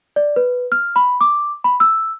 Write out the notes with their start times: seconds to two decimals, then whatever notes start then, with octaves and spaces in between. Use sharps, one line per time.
0.16 D5
0.36 B4
0.72 F6
0.96 B5
1.21 D6
1.64 B5
1.80 E6